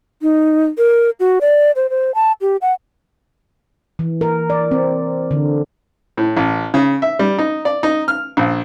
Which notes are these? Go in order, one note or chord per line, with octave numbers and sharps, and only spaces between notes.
D#4
A#4
F#4
D5
C5
C5
A5
G4
F#5
E3
A#4
D5
C4
D3
A2
A1
C#3
E5
G3
D#4
D5
D#4
F6
A#1